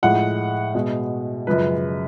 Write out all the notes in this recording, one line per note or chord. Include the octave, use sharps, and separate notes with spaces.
A2 F3 G#3 F#5
B2 G#3
F#2 C#3 F3 G#3 B4